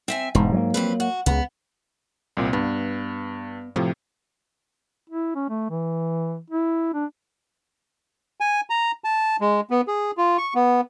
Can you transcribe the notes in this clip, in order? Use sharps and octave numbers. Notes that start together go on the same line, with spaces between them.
C4 E5 G#5
E1 G#2
F#3 G#3 A#3
F2 C4 B4
F#4
C#2 C#3 B3
C2 A#2 C4
G2 B3
A2 C3 F3
E4
C#4
A3
E3
E4
D4
G#5
A#5
A5
G#3
B3
G#4
F4
C#6
B3